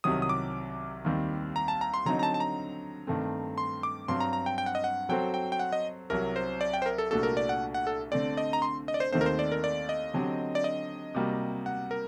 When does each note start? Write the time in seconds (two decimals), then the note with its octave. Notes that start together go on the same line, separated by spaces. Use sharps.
0.04 C2 C3 D#3 F#3 D#6
0.22 D#6
0.29 D6
1.04 D#2 D#3 G3 C4
1.56 A#5
1.68 A5
1.81 A#5
1.94 C6
2.05 D3 F#3 C4 D#4 A#5
2.19 A#5
2.23 A5
2.34 A5
2.40 A#5
3.07 G2 D#3 A3 C4
3.58 C6
3.83 D6
4.08 G2 F#3 C4 C6
4.20 A#5
4.33 A#5
4.46 G5
4.58 G5
4.66 F#5
4.75 D#5
4.84 F#5
5.09 F#3 C4 F#4 A4 C5 G5
5.34 G5
5.52 G5
5.59 F#5
5.72 D#5
6.10 C2 C3 F#3 A#4
6.36 C5
6.61 D5
6.74 G5
6.82 C5
6.86 A#4
6.98 A4
7.11 C2 A#2 A3 D4 F#4 A4
7.23 A#4
7.37 D5
7.49 F#5
7.74 F#5
7.87 A4
8.12 D3 A3 C4 D5
8.37 D#5
8.53 A#5
8.62 C6
8.88 D#5
8.94 D5
9.00 C5
9.12 D#2 D#3 A3 C4 D#4 C5
9.21 A#4
9.26 C5
9.39 D5
9.52 A#4
9.64 D5
9.89 D#5
10.14 D3 F#3 C4 G4
10.55 D5
10.64 D#5
11.15 C3 G3 A#3 F#4
11.66 F#5
11.91 A#4